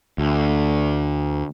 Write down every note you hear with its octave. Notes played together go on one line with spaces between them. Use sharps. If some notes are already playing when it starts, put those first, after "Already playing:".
D2